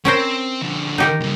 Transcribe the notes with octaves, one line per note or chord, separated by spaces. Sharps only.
C4 C#4 A#4 C5
D3 F3
D#4 G4 A#4
G2 C#3